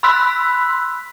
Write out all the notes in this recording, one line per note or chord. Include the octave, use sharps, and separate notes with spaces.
B5 C6 E6 F#6 B6